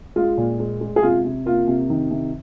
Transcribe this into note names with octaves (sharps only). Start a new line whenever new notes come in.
G#3 F4
A#2
G#3
G#3
G#4
C3 F4
C3
A#3 F4
C3
D#3
C3